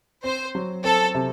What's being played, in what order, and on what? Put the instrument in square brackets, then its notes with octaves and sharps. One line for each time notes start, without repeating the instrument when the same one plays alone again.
[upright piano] C4 [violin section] C5
[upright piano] F#3
[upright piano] C4 [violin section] A4
[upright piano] C3